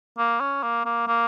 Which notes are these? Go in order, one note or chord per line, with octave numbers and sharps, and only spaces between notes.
A#3
C#4
A#3
A#3
A#3